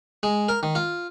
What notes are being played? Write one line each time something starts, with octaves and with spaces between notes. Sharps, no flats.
G#3
A#4
D#3
F4